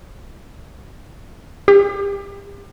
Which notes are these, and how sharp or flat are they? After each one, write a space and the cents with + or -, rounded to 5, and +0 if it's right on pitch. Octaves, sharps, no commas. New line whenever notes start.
G4 +35